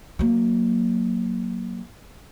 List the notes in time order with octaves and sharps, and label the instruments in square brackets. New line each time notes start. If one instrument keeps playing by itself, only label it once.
[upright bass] F#3 A#3